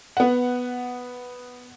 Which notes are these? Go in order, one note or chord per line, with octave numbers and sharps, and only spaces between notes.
B3 F#5